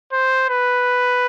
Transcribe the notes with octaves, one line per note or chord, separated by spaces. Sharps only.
C5
B4